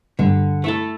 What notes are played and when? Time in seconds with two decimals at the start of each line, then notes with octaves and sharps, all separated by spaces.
0.19 G2 D3 G3
0.64 A3 E4 A4